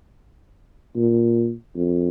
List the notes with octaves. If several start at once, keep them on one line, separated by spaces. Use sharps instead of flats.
A#2
F2